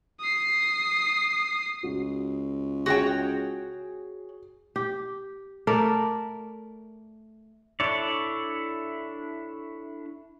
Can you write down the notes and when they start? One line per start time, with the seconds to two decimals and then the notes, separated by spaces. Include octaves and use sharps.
0.20 D#6 C7
1.83 C#2 F#4
2.86 F#4 G#4 C#5 G5
4.76 G4
5.67 A3 A#4 D5
7.80 D4 E4 A4 C#5 D5